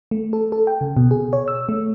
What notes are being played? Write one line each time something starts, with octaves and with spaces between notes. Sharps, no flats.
A3
A4
A4
G5
C#3
B2
G#4
C#5
E6
A3